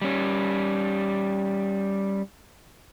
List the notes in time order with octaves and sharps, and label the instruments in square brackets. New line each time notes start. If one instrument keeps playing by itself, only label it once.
[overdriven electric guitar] G3 C#4